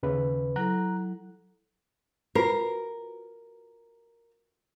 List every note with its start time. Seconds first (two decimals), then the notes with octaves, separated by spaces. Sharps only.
0.03 D#2 C#3 B4
0.56 F#3 E4 A4 A#5 F#6
2.35 F4 F#4 A#4 B4